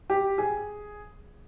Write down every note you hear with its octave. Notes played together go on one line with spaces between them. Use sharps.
G4
G#4